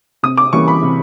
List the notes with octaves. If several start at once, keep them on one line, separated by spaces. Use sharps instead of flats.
C3 D#6
D6
E3 G3 A#3 C#4 C#6
B5
C3